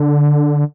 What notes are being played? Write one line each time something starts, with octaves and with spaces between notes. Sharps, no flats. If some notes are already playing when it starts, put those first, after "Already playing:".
Already playing: D3